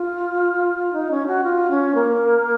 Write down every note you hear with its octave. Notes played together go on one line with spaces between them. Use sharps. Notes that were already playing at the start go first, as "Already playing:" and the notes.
Already playing: F4
D#4
C#4
F#4
F4
C#4
A#3